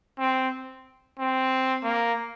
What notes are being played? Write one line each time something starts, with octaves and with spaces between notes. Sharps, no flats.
C4
C4
A#3